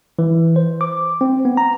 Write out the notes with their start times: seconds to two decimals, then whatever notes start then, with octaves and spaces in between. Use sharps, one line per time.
0.19 E3
0.56 C5
0.81 D6
1.21 C4
1.45 B3
1.57 A#5